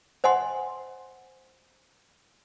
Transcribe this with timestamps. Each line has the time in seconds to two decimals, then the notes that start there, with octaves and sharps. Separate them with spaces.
0.24 C5 D#5 F#5 G#5 C6